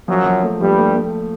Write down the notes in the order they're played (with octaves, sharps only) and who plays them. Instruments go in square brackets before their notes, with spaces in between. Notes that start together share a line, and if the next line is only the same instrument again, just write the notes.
[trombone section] F#2 F#3 [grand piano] F3
[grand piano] F3
A3
[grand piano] A#1 [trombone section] G2 G3
[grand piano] A3
A3